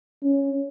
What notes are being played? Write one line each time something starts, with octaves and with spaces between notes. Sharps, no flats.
C#4